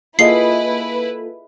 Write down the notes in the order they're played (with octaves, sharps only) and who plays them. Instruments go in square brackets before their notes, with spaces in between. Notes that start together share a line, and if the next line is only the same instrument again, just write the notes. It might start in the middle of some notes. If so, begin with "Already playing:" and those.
[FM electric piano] A#3 F4 A4 [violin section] E4 B4 [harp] G#4 D#5 [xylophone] C7